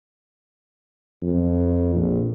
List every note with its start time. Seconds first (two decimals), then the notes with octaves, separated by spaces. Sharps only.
1.22 F2
1.95 A#1